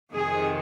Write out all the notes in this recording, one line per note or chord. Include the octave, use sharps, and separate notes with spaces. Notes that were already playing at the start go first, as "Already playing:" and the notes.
F2 C3 D#3 G#4